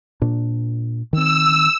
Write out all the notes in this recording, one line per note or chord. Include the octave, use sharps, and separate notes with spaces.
A#2 D4
D#3 C4 E6